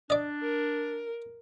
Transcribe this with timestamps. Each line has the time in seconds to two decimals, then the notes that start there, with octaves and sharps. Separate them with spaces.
0.10 D4 D5 D#5
0.42 A#4